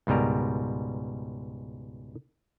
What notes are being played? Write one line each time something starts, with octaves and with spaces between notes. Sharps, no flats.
C#2 G#2 B2 G3 A#4